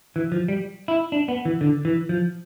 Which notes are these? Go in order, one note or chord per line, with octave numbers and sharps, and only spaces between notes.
E3
F3
G3
E4
D4
B3
E3
D3
E3
F3